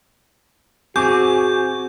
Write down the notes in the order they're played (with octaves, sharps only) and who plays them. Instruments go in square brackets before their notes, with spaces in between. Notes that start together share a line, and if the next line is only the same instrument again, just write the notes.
[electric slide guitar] C4 G#4 [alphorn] F#4 [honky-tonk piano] G#5 C#6 D6 [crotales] G6